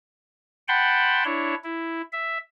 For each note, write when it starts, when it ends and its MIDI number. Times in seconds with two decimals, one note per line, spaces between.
0.68 1.24 78
0.68 1.24 79
0.68 1.24 81
0.68 1.24 83
0.68 1.24 84
1.25 1.55 62
1.25 1.55 64
1.25 1.55 73
1.64 2.01 64
2.12 2.38 76